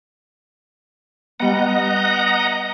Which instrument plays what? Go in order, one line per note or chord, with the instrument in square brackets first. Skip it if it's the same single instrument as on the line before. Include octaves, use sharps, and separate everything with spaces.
[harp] G3 B3 [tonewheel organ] D#5 F#5 A#5